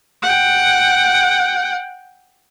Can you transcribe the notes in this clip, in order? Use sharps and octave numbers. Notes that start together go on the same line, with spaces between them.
F#5 G5